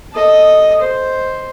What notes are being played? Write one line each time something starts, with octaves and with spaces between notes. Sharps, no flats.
A4 D#5
C5